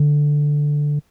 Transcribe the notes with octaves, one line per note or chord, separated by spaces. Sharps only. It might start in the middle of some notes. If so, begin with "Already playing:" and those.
Already playing: D3